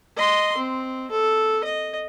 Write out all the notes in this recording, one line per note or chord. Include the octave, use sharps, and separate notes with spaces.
D#5 C6
C4
A4
D#5